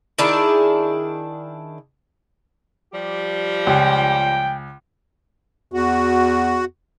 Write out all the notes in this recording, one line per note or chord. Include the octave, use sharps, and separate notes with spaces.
D#3 D4 E4 G#4
F3 G3 G4
C#2 G5
E2 F#4